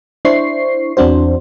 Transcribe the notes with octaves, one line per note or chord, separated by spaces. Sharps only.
D4 E4 C5 C#6 C7
E2 E3 C4 D4 F#4 C5